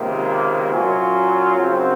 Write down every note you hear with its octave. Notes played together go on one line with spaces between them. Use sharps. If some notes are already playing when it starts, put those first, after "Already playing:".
Already playing: C#2 C3 D#3 A#3
A#2 F#3 C#4 F4
F#2 C#3 F#3 C4 D#4